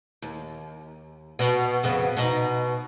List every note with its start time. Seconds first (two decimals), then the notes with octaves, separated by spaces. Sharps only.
0.22 D#2
1.39 B2
1.83 F2 C#3 B3
2.17 B2 D#4